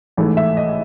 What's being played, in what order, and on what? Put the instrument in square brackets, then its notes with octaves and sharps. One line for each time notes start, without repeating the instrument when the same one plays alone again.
[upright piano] A1 G#2 E3 A3
E5
D#5